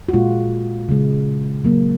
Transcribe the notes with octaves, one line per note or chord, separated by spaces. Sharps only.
F#4
A#2 G#3 F4
C#3 G#3
C#3 F#3 A#3